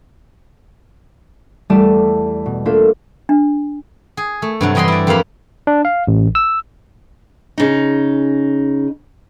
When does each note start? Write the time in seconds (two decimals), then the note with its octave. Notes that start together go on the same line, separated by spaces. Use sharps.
1.70 E2 G3 A3 D5 A5 D#7
2.46 B2
2.65 A3 A#3 D4 F4 A4 A#4
3.29 D4
4.17 G#4
4.42 A3
4.61 G2 C3 F#3
4.75 E3 G3 D#5 B5 C6
4.88 E4 D5
5.07 F2 A#3 G4 C5 F5 B5
5.67 D4
5.85 F5
6.07 A1
6.35 E6
7.58 C#3 D#4